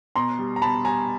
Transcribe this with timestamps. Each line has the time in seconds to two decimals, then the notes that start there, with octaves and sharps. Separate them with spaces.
0.15 B2 A#5 C6
0.39 G3
0.56 A#5
0.62 B2 A5 B5
0.85 G3 G#5 A#5